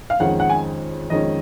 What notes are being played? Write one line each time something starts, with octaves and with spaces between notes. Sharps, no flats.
F5
F2 D#3 G#3 C#4 F#5
F#5
G#5
F2 D#3 G#3 C#4 D#5